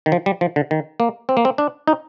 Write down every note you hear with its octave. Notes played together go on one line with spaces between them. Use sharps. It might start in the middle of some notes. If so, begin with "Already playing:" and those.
D#3
F3
G3
F3
D3
D#3
A#3
C4
A#3
C4
D4
D#4